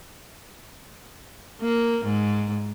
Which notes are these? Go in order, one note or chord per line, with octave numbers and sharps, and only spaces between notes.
A#3
G#2